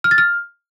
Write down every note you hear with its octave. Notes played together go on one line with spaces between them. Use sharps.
F6
A6
F6